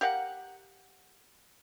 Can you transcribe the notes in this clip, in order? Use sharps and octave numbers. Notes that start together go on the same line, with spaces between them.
G4 A#4 F5 F#5